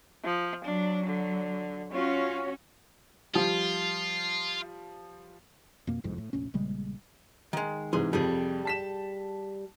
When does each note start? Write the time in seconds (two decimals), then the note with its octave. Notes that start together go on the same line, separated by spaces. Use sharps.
0.25 F3
0.65 F#3 D4
1.06 D3
1.93 C#4 F4 F#4 C#5
3.34 F3 G3 F4
5.87 F2 B2 A#3
6.04 G1 C2 F2 G#2
6.18 A2
6.33 F1 A#1 C#4
6.54 A#1 C#3 G3 G#3
7.53 D#3 G#3
7.93 G#2 C3 E3 G#4 C6
8.13 F2 C3 G3 G#4
8.65 A5 B6 E7